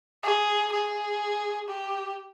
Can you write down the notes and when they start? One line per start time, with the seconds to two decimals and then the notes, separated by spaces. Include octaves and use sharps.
0.23 G#4
0.72 G#4
1.68 G4